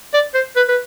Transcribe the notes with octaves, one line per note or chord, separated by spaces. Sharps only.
D5
C5
B4
B4